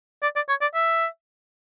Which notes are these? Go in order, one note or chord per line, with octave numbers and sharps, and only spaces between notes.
D5
D5
C#5
D5
E5